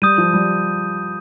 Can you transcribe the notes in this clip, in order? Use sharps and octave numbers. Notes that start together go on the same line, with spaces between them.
G3 D#6 G6 D#7
F3
G3